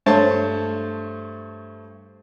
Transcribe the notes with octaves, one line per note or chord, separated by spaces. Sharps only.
G2 A3 C5 C#5 A5